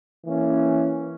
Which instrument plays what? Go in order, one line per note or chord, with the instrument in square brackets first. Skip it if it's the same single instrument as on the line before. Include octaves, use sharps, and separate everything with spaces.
[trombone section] E3 A#3 C#4